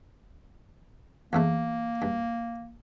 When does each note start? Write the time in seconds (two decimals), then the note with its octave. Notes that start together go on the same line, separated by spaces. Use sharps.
1.33 E2 A2 A3 A#3
2.02 G2